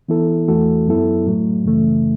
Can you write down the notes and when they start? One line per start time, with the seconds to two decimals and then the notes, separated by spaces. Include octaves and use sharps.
0.09 E3 B3 E4 A4
0.48 E2 E3 A3 F#4 A4
0.87 F#2 F#3 B3 E4 A4
1.26 A2 F#3 A3
1.65 F#2 C#3 E3 A3